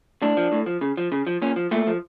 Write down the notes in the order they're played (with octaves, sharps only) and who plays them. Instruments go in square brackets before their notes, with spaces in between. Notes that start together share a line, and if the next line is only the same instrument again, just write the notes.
[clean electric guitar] A2 D4
F3
A2
F3
C#3
F3
C#3
F3
A#2 C#4
F3
A#2 A3
F3